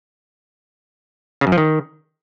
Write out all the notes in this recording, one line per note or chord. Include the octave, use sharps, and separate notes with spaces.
C#3
F#2
F3
D#3